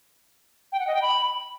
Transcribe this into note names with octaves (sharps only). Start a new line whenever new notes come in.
G5
F#5
D#5
G5
B5